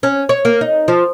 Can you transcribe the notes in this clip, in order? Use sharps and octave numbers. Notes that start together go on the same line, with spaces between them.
C#4
C#5
A#3
D#4
F3